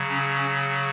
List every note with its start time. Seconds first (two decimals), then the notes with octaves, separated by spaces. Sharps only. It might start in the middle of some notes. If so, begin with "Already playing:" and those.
Already playing: C#3 F#3
0.10 C#4
0.38 C#4